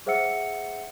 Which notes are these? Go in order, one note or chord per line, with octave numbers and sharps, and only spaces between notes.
G#4 C5 E5 F#5 E6 C#7